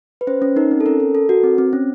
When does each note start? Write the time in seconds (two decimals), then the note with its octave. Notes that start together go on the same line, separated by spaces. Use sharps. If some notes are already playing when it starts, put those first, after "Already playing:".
0.21 B4
0.27 C#4 C5
0.42 C#4
0.56 D#4 A#4
0.71 C4
0.81 A4
0.86 C#4 A#4
1.00 A4
1.15 A4
1.29 F#4
1.43 C4
1.58 C4
1.73 C#4